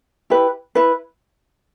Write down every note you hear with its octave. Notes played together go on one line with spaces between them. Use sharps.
E4 G4 B4
E4 B4